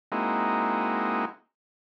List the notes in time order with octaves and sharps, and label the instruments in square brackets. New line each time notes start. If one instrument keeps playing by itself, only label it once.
[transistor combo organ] G#3 A#3 C4 D#4 E4 F#4